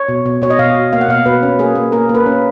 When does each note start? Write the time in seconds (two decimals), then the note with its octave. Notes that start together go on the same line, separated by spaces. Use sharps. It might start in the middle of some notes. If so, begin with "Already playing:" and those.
Already playing: C#5
0.09 B2
0.26 B2
0.42 B2 C#5
0.50 D#5
0.59 B2 F5
0.75 B2
0.93 A#3 F5
1.01 F#5
1.09 B2 F5
1.26 B2 B4
1.43 C#4
1.59 A#3 G#4
1.75 A#3
1.92 A#3 A#4
2.09 A#3
2.15 B4
2.26 C#4